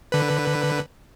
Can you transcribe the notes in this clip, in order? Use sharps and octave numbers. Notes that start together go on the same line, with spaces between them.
D3 B4